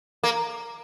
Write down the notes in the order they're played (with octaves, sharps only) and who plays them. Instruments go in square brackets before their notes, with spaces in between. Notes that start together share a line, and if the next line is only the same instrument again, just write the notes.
[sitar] A#3